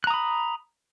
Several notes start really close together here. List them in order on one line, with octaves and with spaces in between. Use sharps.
F#6 A#5 D#6 B5